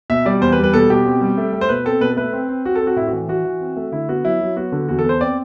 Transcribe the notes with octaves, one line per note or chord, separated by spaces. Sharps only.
B2 E5
G3 D5
E2 C5
B4
G3
B4
B2 A4
B2 G4
C4
G3
A3
A3
C5
B2 B4
C4 A4
B2 B4
A4
A3 B4
C4
C4
C4 F#4
A4
C4
F#4
A2 E4
F#4
E3
E3 F#4
E3
C4
A3
D3 E4
B3 F#4
F#3 E4
F#3
B3 F#4
D3
E2 F#4
A4
B3 C5
C4 D5